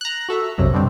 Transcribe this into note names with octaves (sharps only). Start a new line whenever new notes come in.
A#5 F#6
F#4 A4 E5
B1 F#2 C3 F#3
B2 D3 G3 C4